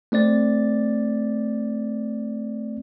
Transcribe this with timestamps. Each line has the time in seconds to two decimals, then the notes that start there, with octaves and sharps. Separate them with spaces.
0.12 A3 C4 D5 A6